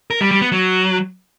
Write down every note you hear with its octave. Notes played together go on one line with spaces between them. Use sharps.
A#4
G3
G3
B3
F#3